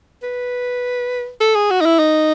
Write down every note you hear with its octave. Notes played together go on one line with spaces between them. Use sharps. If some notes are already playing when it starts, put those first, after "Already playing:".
B4
A4
G#4
F#4
D#4
E4
D#4